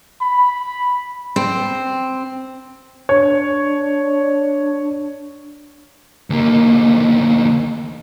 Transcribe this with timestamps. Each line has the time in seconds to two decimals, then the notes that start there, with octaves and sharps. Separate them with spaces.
0.22 B5
1.36 C4
3.09 D4 C#5
6.30 D2 A#3